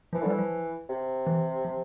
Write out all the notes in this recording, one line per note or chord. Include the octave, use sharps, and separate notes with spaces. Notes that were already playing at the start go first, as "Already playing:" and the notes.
E3 F3
D3
E3 G3
F3
C3
E3
F3